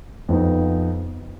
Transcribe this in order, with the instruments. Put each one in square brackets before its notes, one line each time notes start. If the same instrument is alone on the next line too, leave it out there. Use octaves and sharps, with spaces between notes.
[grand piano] F2 F3 B3 D#4